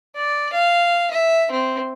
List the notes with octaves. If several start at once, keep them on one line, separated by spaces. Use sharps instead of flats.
D5
F5
E5
C4